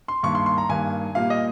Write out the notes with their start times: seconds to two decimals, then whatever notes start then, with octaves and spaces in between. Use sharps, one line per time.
0.08 C6
0.23 G2 D#3 A#3 C#6
0.35 C6
0.46 C6
0.58 A#5
0.69 G2 D#3 A#3 G#5
1.15 A#2 G3 A#3 F5
1.30 D#5